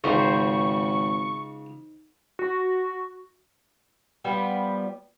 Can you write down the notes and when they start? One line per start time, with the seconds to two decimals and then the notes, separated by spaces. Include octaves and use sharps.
0.04 G#1 C#2 D#4 C5 C#6
2.39 F#4
4.24 F3 G3 B3